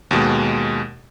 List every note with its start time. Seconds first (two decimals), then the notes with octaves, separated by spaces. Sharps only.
0.11 D#2 B2 G#3